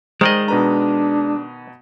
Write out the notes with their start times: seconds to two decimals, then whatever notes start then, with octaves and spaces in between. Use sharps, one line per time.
0.21 D#3 G#3 C5 D5 D#5
0.48 B2 D4 B4 A#5